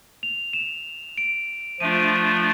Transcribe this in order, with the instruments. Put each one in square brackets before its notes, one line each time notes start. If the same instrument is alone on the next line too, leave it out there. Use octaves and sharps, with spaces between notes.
[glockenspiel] F7
E7
D7
[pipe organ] F3 A3 D4 F4 [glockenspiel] D#7
[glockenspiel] D7
D#7